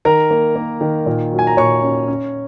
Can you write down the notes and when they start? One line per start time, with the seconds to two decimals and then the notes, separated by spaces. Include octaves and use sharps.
0.05 D#3 A#4 A#5
0.31 A#3
0.56 A#3
0.81 D#3
1.06 A#2
1.32 F#3
1.39 G#5
1.47 A#5
1.57 A#2 C#5 C#6
1.83 C#4
2.08 C#4